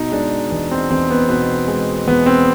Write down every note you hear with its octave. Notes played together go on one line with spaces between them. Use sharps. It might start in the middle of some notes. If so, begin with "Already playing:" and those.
Already playing: B2 D#4
G#3 D4
E2
C4
E2 C4
B3
B2 B3
G#3
E2 B3
C4